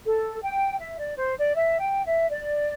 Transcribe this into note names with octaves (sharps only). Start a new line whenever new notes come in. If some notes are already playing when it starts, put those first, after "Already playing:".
A4
G5
E5
D5
C5
D5
E5
G5
E5
D5